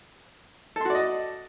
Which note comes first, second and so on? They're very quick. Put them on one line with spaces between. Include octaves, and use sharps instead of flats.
A4 C6 F#4 D5 D#5